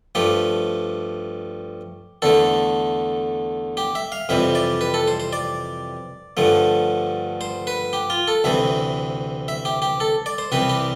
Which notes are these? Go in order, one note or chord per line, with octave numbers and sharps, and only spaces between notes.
G2 F3 A3 G4
E2 D3 A3 A4
G4
E5
F5
F2 C3 E3 G3 E5
D5
B4
A4
C5
C5
D5
G2 D3 F3 A3
C5
B4
G4
F4
A4
D2 C3 E3 E5
E5
G4
G4
A4
D5
C5
C2 C3 E3 G3 B4
G4